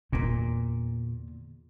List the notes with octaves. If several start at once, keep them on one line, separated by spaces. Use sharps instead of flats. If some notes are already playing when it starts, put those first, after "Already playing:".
E2 A#2 D3